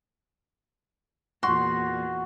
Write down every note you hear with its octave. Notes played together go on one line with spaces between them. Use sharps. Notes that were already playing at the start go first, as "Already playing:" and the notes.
E2 A#2 F#4 C6